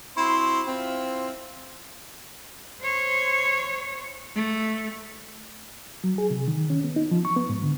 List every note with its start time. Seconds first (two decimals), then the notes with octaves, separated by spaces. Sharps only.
0.17 C4 E4 F#4 C6
0.68 C4 E4 F4
2.82 C5 C#5
4.35 A3
6.04 F#3
6.18 G#4
6.30 C3
6.48 D#3
6.70 C#4
6.84 B3
6.96 D#4
7.11 F3
7.25 C#6
7.36 B3
7.50 G#2
7.63 D3